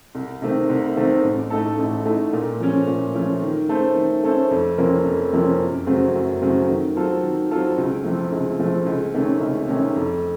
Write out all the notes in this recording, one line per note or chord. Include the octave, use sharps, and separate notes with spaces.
C2
C3 D#3 A3 C4
C2
C3 D#3 A3 C4
A1
A2 A3 D#4 A4
A1
A2 A3 D#4 A4
A#2
F3 A3 C#4
A#2
F3 A3 C#4
D#3
A3 C#4 A4 C5
D#3
A3 C#4 A4 C5
F2
C3 F3 A#3 C#4
F2
C3 F3 A#3 C#4
F#2
C#3 F#3 A3 C4
F#2
C#3 F#3 A3 C4
D#3
F#3 C4 F4 A4
D#3
F#3 C4 F4 A4
C#2
C3 F3 A3
C#2
C3 F3 A3
C#2
C3 D#3 A3 C#4
C#2
C3 D#3 A3 C#4
F2